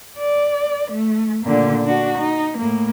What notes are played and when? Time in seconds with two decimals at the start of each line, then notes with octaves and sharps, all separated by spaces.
0.18 D5
0.91 A3
1.43 A#2 D3
1.83 D4 F#4
2.18 D#4
2.58 A2 A#3